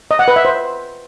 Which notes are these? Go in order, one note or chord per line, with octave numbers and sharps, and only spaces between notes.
D#5
F#5
B4
E5
C5